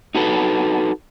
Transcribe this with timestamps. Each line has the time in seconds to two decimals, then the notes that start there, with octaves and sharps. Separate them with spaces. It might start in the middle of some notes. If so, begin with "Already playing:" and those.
0.15 D#4 F#4 A4 B4